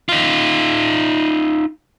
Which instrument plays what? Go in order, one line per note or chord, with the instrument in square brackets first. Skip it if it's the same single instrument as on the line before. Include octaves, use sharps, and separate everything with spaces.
[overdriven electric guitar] D#4 F4